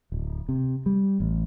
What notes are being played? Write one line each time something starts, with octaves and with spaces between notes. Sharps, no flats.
D1
C3
G3
A1